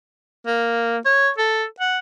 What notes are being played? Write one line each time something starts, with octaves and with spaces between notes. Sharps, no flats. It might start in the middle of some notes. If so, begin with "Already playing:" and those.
A#3
C#5
A4
F#5